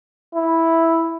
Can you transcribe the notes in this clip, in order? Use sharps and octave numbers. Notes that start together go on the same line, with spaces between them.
E4